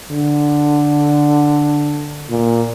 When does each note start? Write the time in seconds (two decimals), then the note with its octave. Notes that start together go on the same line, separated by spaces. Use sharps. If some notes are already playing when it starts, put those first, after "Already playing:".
0.11 D3
2.30 A#2